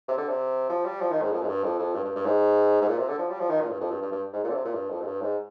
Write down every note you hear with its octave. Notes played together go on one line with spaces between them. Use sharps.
C3
D3
C3
F3
G3
F3
D#3
G#2
F2
G#2
G2
F2
F2
G2
G2
G2
G#2
G#2
A#2
C3
D3
F3
G3
F3
D#3
A#2
G2
F2
G2
G2
G2
G#2
A#2
D3
C3
A#2
G2
F2
G#2
G2
G#2